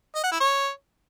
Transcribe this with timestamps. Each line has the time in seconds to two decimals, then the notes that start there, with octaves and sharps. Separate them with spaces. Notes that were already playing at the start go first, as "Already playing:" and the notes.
0.15 D#5
0.23 F#5
0.32 E4
0.40 C#5